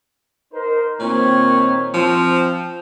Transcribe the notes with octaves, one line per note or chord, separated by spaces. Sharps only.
D#4 A#4 C5
A#2 D#3 C4 C#5
F3 C4